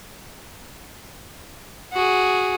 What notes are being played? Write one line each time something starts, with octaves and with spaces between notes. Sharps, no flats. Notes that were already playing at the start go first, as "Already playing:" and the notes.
F#4 G#4